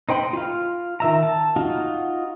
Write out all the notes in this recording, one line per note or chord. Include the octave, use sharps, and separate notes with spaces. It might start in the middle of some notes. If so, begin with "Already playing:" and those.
D#4 C5 G5 B5 C6
F4 F5
D#3 E5 A#5
A5
D#4 F4 F#4